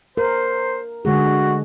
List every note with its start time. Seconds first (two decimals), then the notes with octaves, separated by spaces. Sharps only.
0.17 A#4 C5
1.05 D3 G#3 F#4 G#4